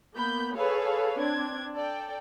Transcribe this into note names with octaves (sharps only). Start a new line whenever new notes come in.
A#3 B3 B5 G6
G#4 A4 B4 C#5 F5
C4 D4 G#6
A4 D5 G5